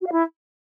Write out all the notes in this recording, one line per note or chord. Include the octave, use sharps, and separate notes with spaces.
F#4
F5
E4